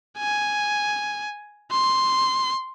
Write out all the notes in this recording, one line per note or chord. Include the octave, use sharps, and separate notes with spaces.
G#5
C6